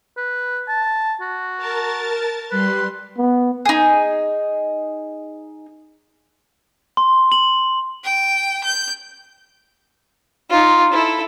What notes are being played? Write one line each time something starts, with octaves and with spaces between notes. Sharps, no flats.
B4
A5
F#4
A#4 A5 A6
G3 B4 C6
B3
D#4 G#4
C6
F#7
G5
G6
D#4 F4
E4 A4